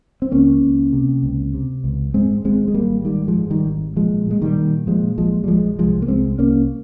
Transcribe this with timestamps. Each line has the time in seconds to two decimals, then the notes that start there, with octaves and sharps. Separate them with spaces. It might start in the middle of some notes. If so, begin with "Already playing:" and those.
0.22 C4
0.31 C#2 A#3 C#4
0.62 C#2
0.93 C3
1.23 C#2
1.54 C3
1.84 C#2
2.14 G#2 G#3 C4
2.44 G#1 G#3 C4
2.68 G#3
2.74 G#1 G3 A#3
3.05 G#2 D#3 G3
3.28 F3 G#3
3.35 G#2
3.50 D#3 G3
3.66 G#1
3.96 A#2 F3 G#3
4.27 A#2 G#3
4.42 D#3 G3
4.57 A#2
4.87 A#2 F3 G#3
5.18 A#1 F3 G#3
5.44 G3
5.48 A#1 F3 G#3
5.78 C2 F3 G#3
6.02 A#3
6.08 C2 G#3 C4
6.39 C2 A#3 C#4